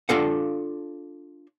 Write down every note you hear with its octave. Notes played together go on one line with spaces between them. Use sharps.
D4 F4 A4 F5 F#5